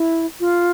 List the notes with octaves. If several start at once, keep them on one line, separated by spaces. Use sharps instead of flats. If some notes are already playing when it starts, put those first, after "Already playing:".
Already playing: E4
F4